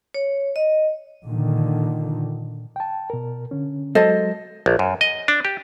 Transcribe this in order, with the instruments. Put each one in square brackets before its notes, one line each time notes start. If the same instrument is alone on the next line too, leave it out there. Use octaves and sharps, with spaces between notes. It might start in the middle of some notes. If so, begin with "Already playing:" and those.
[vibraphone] C#5
D#5
[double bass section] A#2 D3 D#3
[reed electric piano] G5 A5
B2 A#4
D3 C#4
[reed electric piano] F#3 G#3 [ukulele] A4 C5 D#5
[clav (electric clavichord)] A#1
F#2
D#5
D4
G4